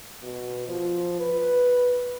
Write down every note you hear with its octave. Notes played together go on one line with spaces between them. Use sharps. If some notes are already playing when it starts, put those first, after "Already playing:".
B2
F3
B4